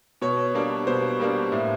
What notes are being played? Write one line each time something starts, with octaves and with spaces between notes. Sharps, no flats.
B2 C#5
G3 A#3 D4
B2 C5
G3 A#3 D4
A2